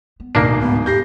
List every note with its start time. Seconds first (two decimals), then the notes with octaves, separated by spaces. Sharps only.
0.20 B3
0.35 D1 B2 A#3 D4 D#4 C7
0.61 G#2 B3
0.86 E2 G4 G6 A#6 C7